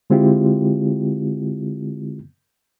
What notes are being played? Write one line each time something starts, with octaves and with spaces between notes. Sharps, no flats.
D3 G#3 C4 E4 F4 G4